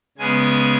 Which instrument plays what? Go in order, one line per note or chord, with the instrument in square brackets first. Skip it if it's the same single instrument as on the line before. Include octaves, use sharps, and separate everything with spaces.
[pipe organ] C#3 G#3 B3 G#5